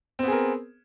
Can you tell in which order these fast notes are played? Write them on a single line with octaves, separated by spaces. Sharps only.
C4 B3 G#4 A#4